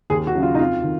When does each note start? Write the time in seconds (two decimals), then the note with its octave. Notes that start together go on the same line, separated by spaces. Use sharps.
0.10 D#2 G#4
0.27 F#4
0.35 C#3 F#3
0.43 F4
0.55 D#4
0.59 F2 F4
0.83 D#3